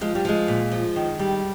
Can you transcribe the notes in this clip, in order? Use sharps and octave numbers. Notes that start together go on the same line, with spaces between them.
F3 G#3
G3
F3 G#3
A#2
F3
D#3
G3